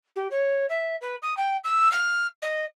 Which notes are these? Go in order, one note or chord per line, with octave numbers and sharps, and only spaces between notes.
G4
C#5
E5
B4
D#6
G5
E6
F6
D#5